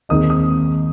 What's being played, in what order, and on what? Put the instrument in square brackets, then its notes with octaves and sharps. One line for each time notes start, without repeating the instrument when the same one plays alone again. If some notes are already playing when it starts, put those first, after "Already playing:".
[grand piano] D#2 D#3 G#3 C4 D#4 D#6
D#6